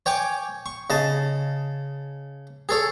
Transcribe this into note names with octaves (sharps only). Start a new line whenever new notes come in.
C#5 G5 G#5 D6
C#6
C#3 D#5 A5
G#4 A4 C#5